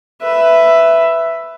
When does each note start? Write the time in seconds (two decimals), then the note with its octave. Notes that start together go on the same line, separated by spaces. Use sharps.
0.22 B4 E5